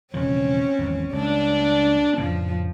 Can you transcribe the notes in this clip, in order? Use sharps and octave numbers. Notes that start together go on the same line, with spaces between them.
E1 C#3 F3 C4 C#4
G#1 E2
C#2 G2 D4 D5
F2 A2 C#3 F3